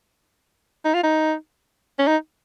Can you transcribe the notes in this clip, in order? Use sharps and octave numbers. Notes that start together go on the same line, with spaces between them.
D#4
F4
D#4
C#4
D#4